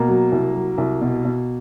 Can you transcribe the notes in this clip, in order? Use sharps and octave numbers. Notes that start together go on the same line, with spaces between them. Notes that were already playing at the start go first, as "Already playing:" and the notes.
Already playing: B2 A#3
F#3
C2
F#3
C2
B2
B2